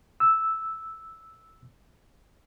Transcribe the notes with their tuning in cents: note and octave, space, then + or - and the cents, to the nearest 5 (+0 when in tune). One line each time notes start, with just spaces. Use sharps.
E6 -5